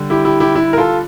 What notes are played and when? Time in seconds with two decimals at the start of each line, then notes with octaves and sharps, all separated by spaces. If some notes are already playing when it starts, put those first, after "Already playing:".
Already playing: D3 G3
0.10 E4 G4
0.25 E4 G4
0.40 E4 G4
0.55 E4
0.73 A#4
0.77 F4 A4